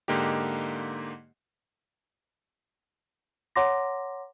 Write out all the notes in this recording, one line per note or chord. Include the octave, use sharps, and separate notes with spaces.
G#2 D3 A#3 D#4 G4
C#5 F#5 A#5 C6 D6 A#6